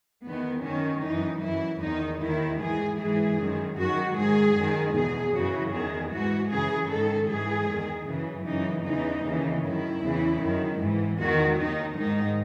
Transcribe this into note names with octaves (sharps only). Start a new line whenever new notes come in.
E2 D#3 B3
F#2 D#3 C#4
F#2 E3 D#4
F#2 E3 E4
E2 D#3 D#4
D#2 D#3 E4
G#2 E3 G#4
G#2 E3 G#4
F#2 D#3
F#2 D#3 F#4
G#2 D#3 G#4
F#2 D#3
E2 B2 G#4
F#2 C#3 E3 F#4
E2 D#3 G#4
G#2 E3 F#4
F#2 C#3 E3 G#4
G#2 D#3 A4
G#2 E3 G#4
E2 D#3
F#2 C#3 E3
F#2 C#3 E3 D#4
E2 C#3 E3 D#4
D#2 C#3 E3
F#2 D#3 E4
E2 C#3 E3
F#2 D#3
G#2 E3
E2 D#3 F#4
D#2 D#3 D#4
G#2 D#3 D#4